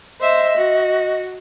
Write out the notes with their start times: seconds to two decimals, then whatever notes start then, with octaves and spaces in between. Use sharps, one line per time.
0.21 C5 D#5 E5
0.57 F#4